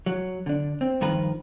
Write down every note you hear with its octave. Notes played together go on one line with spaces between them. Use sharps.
F#3
D3 D4
C4
G2 D#3 F3 A#4 B4